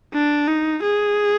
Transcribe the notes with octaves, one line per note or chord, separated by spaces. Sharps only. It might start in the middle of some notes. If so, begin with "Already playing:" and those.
D4
D#4
G#4